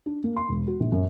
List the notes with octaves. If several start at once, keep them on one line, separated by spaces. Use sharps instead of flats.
D4
A#3
C6
E1
F#4
A#1
F#2